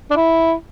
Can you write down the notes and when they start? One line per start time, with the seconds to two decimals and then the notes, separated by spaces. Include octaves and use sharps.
0.11 D4
0.16 E4